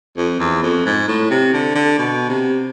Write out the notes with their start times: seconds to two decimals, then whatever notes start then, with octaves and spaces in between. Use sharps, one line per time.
0.17 F2
0.40 E2
0.63 F2
0.86 G#2
1.08 A2
1.30 C3
1.53 D3
1.75 D3
1.98 B2
2.29 C3